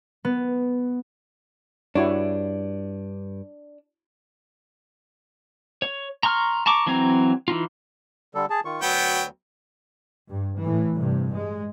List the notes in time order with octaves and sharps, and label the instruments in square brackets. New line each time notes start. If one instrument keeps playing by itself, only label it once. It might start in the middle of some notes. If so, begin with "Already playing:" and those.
[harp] B3
[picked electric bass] G2 [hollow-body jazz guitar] D4 [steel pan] E4 F#4 C#5
[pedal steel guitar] C#5
A#5 C6 C#6 F6
A5 A#5 C#6 D6
E3 F#3 C4 G#5 A#5
E3 D#4 F4
[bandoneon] D3 G3 A4
G#4 A5
D#3 F4 C#6
[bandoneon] D2 [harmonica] F#3 B3 G5
[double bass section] G2
A2 E3
G2 C3
G#3